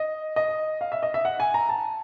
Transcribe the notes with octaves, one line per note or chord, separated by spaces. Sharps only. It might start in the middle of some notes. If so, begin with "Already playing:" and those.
Already playing: D#5
D#5
F5
E5
D#5
E5
F#5
G#5
A#5
A5